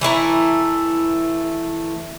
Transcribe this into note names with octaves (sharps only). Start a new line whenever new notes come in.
E3 A3 E4 A#5